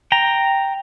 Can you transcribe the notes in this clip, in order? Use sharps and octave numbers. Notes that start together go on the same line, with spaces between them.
G5 A#5